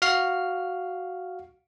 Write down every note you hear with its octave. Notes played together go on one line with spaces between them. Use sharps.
F#4 F5 F6 C7